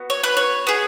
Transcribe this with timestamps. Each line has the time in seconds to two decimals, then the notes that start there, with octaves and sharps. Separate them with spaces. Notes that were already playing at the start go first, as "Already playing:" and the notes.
Already playing: B3 F#4
0.10 C#5
0.24 B4
0.37 C#5
0.67 B3 G#4